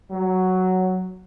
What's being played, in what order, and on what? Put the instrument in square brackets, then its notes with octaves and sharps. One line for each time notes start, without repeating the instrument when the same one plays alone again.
[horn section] F#3